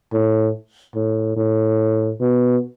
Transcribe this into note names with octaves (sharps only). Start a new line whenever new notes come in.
A2
A2
A2
B2